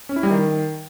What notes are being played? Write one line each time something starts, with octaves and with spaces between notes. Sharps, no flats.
C#4
E4
G3
D#3